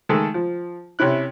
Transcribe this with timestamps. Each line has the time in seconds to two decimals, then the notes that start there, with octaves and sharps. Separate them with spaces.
0.09 D#3 G#3 A3 A4
0.34 F3
0.99 C3 C#4 E4 F#6